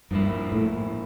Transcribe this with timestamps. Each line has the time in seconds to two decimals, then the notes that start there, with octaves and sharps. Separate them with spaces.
0.11 G2 A#2 F3 A#3 E4
0.52 A2